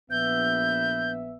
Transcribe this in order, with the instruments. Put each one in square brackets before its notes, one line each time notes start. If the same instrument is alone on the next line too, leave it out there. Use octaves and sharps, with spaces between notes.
[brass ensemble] A#1 B3 E5 [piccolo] G6